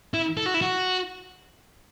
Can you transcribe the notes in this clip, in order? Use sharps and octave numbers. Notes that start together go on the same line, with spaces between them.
E4
A4
F#4
E4
F#4